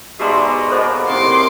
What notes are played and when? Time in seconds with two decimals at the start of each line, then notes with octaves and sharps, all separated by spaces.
0.20 G#2 B2 G#3 G4 D5 E5 A#5 C6
0.70 A#3 B3 F#4 A4 C5 D#5
1.08 A2 C3 D#3 C4 C6 D6